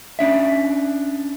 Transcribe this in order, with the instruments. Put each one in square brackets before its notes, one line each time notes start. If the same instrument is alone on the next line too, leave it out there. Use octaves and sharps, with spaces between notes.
[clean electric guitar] C#4 D4 E5